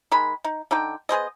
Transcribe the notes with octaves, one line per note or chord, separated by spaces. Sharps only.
D#3 G#3 B5
D#4
D3 D#4 G5
B3 G#4 C5 D#5